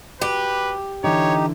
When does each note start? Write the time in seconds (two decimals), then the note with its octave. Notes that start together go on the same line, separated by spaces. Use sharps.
0.21 F#4 G4 B4
1.04 D3 E3 D#4 G4 C#5